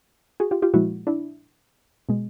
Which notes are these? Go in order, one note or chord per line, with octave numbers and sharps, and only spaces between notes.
F#4 G#4
F4 G4
F4 G4
A#2 F3 G#3 E4 F#4
D4 E4
B2 G#3